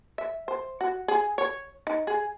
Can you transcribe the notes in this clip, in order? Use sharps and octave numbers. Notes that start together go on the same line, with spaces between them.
E5
C5
F#4
G#4
C#5
D#4
G#4